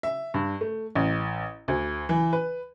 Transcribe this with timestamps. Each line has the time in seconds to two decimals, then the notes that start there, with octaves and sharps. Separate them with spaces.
0.03 E5
0.34 G2
0.61 A3
0.95 A1
1.68 D2
2.09 E3
2.33 B4